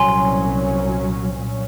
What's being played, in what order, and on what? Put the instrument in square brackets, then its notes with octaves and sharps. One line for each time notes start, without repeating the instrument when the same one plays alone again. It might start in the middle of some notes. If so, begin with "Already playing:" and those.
Already playing: [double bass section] C2 A#2 F#3 C#4 [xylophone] G#5 C6
[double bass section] A#2 F#3 C#4